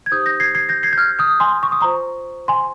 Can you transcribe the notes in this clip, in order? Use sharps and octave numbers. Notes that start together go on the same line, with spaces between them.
G#6
D#4 G4 C5 D#6 G6
G6 A#6
G#6 C7
G#6 C7
G6 A#6
G#6 C7
G6
F6 G#6
D#6 G6
G#5 C6
C#6
D#6
F4 C5 A#5 C#6
G#5 C6